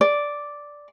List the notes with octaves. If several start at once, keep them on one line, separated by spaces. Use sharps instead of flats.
D5